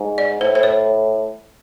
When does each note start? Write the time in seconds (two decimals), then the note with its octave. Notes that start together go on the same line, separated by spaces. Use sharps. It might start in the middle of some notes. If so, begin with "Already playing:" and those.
Already playing: G#2
0.18 D5
0.41 A2 C5
0.55 C5
0.63 C#5